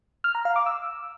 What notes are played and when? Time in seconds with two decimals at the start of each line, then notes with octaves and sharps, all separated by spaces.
0.24 F6
0.35 A#5
0.45 F5
0.56 D6
0.66 E6